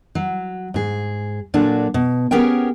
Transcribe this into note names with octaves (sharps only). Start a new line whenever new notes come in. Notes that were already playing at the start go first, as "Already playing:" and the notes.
F#3
G#2 G#4
A#2 F#3 D4 F#4 A4
B2
B3 C#4 G4 G#4 A#4 G5